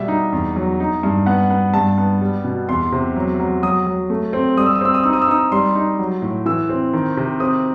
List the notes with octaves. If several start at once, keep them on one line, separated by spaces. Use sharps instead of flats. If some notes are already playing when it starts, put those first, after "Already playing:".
Already playing: B2 G3 E5
D#4
E2
F#3
D#4
G2
B3 F#5
B3
G2 A5
B3
G3
B2
E2 C6
C3
F#3
F#3
F#3 D#6
F#3
A3
C4
G3 D#6
E6
D#6
C4 E6
D#6
D#4 E6
D#6
E6
D#4 D#6
G3 C6
D#4
F#3
A2
E3 E6
C4
D#3
C3
C4 D#6